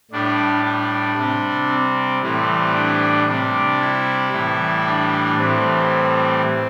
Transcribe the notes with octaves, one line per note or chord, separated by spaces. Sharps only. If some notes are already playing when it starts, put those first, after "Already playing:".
A2 G3 D4
D4
C3 G3
C4
A2 E3 G3 C4
D4
C3 G3 D4
E4
A2 E3 G3
D4
A2 E3 G3 C4